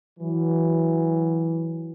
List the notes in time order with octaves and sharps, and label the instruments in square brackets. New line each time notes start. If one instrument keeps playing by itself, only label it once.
[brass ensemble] E3 F#3